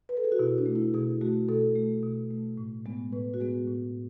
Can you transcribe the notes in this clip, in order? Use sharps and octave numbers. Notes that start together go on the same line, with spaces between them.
B4
A4
G#4
F#4
B2 E4
D4
A3
E4
B2 G#4
A3 F#4
B2 A4
A3
B2
A3
A2
G#3 B3
A2 B4
F#4
G#3 B3 G#4
A2